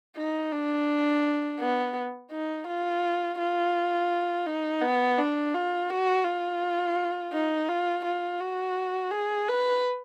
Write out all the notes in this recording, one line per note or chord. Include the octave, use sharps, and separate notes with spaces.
D#4
D4
B3
D#4
F4
F4
D#4
B3
D4
F4
F#4
F4
D#4
F4
F4
F#4
G#4
B4